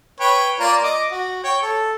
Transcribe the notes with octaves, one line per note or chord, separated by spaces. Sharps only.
B4 C#5 G5
A#3 F4 D5
D#5 D6
F#4
C#5 G5
A4